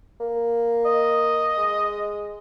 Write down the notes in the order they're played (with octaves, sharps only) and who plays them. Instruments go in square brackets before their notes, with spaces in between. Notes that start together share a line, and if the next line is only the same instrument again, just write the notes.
[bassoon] A#3
[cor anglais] D#5
[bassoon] G#3